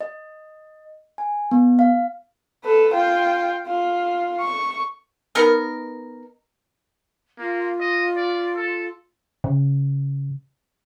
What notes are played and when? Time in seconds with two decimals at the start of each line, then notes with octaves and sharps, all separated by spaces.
0.01 D#5
1.18 G#5
1.51 B3
1.79 F5
2.64 A4 B4
2.94 F4 G5
3.67 F4
4.41 C#6
5.35 B3 D#4 A#4
7.39 A#3 F4
7.80 D#5
8.16 D5
8.56 A4
9.44 C#3